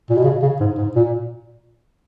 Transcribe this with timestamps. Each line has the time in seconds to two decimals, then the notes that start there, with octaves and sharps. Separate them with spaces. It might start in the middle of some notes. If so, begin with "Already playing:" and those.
0.10 A#2
0.17 B2
0.24 C#3
0.42 C#3
0.60 G#2
0.78 G#2
0.95 A#2